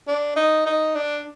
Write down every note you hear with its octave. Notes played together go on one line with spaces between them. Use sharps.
D4
D#4
D#4
D4